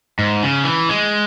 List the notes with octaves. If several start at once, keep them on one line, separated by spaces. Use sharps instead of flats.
G#2
C#3
E3
G#3